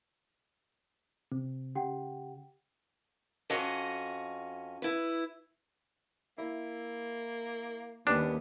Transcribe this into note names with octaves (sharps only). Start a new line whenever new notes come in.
C3
C#3 G4 F#5 G5
F2 C#4 F#4 D#5
E4 B4
A#3 E4
D#2 G3 B3 C#4 D4 G4